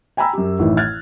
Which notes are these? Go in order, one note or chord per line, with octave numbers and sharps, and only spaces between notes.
G5 G#5 A#5 B5 E6
F#2 G4
A1 D#3 E3
F6 F#6 G#6 A6